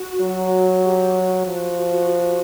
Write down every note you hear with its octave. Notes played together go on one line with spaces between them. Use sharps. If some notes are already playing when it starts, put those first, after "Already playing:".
Already playing: F#4
F#3
G4
F#4
F3 F#4